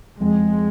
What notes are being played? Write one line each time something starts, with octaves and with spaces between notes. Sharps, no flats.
F2 G#3